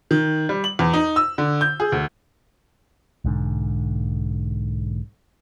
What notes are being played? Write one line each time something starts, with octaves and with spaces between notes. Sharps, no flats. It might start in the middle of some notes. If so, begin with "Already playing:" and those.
D#3
G3
F#7
E2
D#4
E6
D3
G6
G#4
D2
B1 G#2 D3